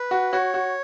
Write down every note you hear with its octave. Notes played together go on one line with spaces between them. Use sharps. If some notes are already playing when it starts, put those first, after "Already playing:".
Already playing: B4
F#4
F#4 C#5
F#4